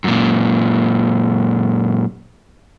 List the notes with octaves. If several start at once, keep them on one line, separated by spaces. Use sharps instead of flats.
F#2 A#2